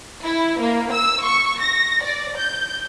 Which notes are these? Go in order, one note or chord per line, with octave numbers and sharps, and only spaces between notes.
E4
A#3
E6
C#6
A#6
D5
G6